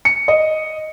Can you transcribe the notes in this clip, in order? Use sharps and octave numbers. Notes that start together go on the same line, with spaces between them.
C#7
D#5